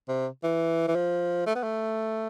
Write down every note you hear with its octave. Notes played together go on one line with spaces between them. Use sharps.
C3
E3
E3
F3
A3
B3
A3